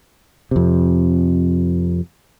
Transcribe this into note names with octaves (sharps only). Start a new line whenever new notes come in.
F2 C3